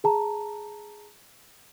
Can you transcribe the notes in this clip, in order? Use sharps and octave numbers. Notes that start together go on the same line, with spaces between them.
G#4 A5 A#5